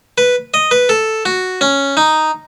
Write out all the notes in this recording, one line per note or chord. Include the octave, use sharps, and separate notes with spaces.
B4
D#5
B4
A4
F#4
C#4
D#4